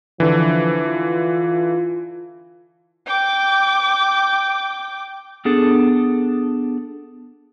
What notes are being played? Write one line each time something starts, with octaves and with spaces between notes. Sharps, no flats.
D3 E3 F3
F4
G5 D6
B3 D4 G#4 A4